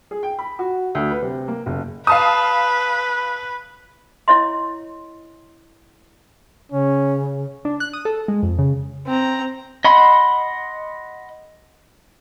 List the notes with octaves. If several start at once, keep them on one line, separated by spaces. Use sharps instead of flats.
G#4
G5
B5
F#4
D2
B4
C3
A#3
F#1
B4 F5 A5 D#6
E4 C#5 D#5 C6
C#3 C#4
D4
F#6
D#6
A4
G#3
F2
C#3
C4 A#5
D#5 F#5 B5 C6